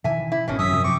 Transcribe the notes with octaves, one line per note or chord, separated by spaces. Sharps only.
B2 D#3 E3 E5 G#5
E4
G#1 B2 D#3 C#4
F#2 C#4 E5 D#6
C3 F3
C4 C#6 D6